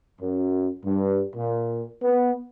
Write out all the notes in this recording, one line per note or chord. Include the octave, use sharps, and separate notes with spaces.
F#2
G2
A#2
B3